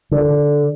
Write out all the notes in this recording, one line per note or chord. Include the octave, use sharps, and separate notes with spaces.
D3